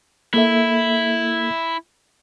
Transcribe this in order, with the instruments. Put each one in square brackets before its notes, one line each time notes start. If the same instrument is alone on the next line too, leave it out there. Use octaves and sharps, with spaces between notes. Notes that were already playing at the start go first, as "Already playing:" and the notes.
[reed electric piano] A#3 A4 E5 [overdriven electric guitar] E4